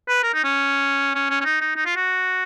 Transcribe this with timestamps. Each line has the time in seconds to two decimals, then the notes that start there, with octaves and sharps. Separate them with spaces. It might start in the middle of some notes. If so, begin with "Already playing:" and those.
0.08 B4
0.23 A#4
0.34 D#4
0.44 C#4
1.15 C#4
1.30 C#4
1.41 C#4
1.45 D#4
1.61 D#4
1.76 D#4
1.86 F4
1.96 F#4